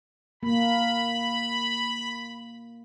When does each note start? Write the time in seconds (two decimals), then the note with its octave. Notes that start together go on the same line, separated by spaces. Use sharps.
0.43 A#3 B5